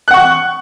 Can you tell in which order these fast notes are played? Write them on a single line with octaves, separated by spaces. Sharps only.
F#6 F#5 C#6